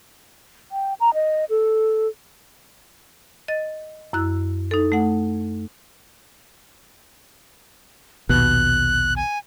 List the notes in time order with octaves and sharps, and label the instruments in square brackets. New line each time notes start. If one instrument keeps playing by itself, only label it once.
[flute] G5
A#5
D#5
A4
[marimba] D#5 A6
F#2 E4 E6 F#6
D#4 A4
A3 F#5
[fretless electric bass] A#1 D#2 B2 [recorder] F#6
[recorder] G#5